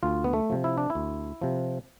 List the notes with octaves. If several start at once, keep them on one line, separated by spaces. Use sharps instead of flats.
D2 F4
B3
A3
C3 F3
E4
D4
E4
D2
C3 F3